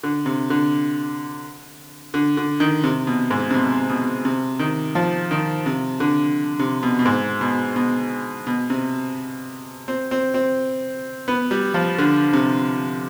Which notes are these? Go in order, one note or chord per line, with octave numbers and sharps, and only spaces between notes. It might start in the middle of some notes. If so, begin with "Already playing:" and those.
D3
C3
D3
D3
D3
D#3
C3
B2
G#2
C3
B2
B2
C3
D#3
F3
D#3
C3
D3
C3
B2
B2
G#2
B2
B2
B2
C3
C4
C4
C4
B3
G3
F3
D3
C3